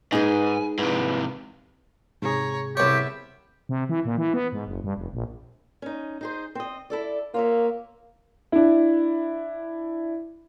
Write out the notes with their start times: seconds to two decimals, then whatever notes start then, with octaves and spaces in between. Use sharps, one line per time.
0.12 G#2 D#4 G#4 B4 G#5
0.79 G#2 C3 F3 E4 B4
2.22 G#2 C3 G#4 C#5 A#5
2.77 C2 B3 G4 C#5 E5
3.69 C3
3.89 E3
4.05 A#2
4.18 E3
4.34 B3
4.52 G#2
4.67 F#1
4.84 G2
4.97 F1
5.13 A#1
5.82 C#4 D#4
6.21 D#4 G#4 C5
6.55 C4 D#5
6.90 E4 A4 D5
7.34 A#3 F4 C#5 E5
8.52 D4 E4